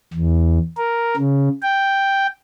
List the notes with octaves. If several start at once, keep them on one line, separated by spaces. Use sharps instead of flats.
E2
A#4
C#3
G5